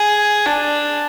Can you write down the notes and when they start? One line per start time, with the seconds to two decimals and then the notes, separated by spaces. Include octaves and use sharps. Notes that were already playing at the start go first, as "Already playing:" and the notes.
Already playing: G#4
0.46 D4